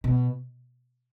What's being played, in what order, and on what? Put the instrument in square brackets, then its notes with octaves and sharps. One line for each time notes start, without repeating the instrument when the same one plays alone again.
[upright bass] B2